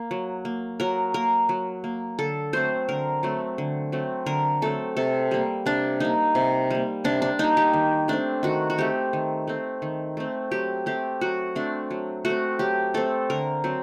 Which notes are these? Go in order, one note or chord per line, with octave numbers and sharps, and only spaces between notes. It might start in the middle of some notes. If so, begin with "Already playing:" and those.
Already playing: A#3 A#4
F#3
A#3
F#3 A#4
A#3 A#4
F#3
A#3
D3 A4
F#3 A3 C4 C5
D3 A#4
F#3 A3 C4
D3
F#3 A3 C4
D3 A#4
F#3 A3 C4 A4
C3 A4
G3 A#3
C3 D4
G3 A#3 D#4
C3
G3 A#3
C3 D4
D4
G3 A#3 D#4
G4
D#3
A3 C4 D4
D#3 F#4
F#4
A3 C4 G4
D#3
A3 C4
D#3
A3 C4
F#3 G4
A3 C4 G4
F#3 F#4
A3 C4 D4
F#3
A3 F#4
C4
F#3 G4
A3 C4 A4
D3 A#4
F#3 C4